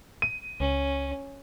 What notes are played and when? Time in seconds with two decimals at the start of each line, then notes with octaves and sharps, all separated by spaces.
0.22 D#7
0.60 C#2 C#4